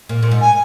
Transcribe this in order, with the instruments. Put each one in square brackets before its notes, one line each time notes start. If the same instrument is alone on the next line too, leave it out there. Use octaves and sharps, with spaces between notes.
[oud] A#2
A#2
G#2
[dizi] G#5